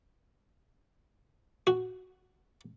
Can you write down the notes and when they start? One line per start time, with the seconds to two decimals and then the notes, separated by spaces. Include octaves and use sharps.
1.67 F#4